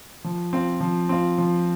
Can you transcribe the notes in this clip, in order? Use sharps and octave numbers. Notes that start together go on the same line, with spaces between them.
F3
C4 F4
F3
C4 F4
F3